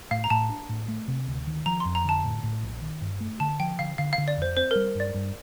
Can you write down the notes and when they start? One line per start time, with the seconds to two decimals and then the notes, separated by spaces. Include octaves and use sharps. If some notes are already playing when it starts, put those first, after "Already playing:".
0.11 A2 F5
0.24 A#5
0.30 A2 A5
0.50 D4
0.69 A2
0.88 A3
1.08 C3
1.27 D2
1.47 D#3
1.66 F3 A#5
1.80 C6
1.85 F2
1.95 A#5
2.05 D3 A5
2.24 A2
2.43 A2
2.63 A#1
2.82 D#3
3.01 G2
3.20 A3
3.40 D3 A5
3.60 F3 G5
3.79 D3 F5
3.98 D3 F5
4.13 F5
4.18 D3
4.28 D5
4.37 F2 C5
4.57 C4 C5
4.71 G3 A#4
4.95 G2 D5
5.15 G2